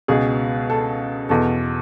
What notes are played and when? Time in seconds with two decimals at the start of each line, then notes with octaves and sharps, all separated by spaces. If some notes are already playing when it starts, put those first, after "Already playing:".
0.08 C#2 B2 G#4
0.70 A4
1.29 E2 B2 A4